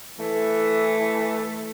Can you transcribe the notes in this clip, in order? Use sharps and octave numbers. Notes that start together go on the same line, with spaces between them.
E3 A3